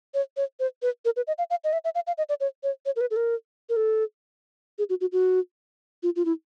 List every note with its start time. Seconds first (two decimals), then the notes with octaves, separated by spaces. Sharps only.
0.14 C#5
0.37 C#5
0.60 C5
0.82 B4
1.05 A#4
1.16 B4
1.27 D#5
1.38 F5
1.50 F5
1.64 D#5
1.73 E5
1.84 E5
1.95 F5
2.07 F5
2.18 D#5
2.29 D5
2.40 C#5
2.63 C#5
2.86 C#5
2.96 A#4
3.01 B4
3.11 A4
3.16 A#4
3.69 A#4
3.76 A4
4.79 G#4
4.90 F#4
5.01 F#4
5.12 F#4
6.03 F4
6.16 F4
6.25 E4